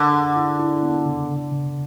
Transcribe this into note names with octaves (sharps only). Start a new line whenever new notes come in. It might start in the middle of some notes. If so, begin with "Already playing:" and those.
Already playing: D3 A#4
G#4
E4
E4
B3
C#3
C#3
C#3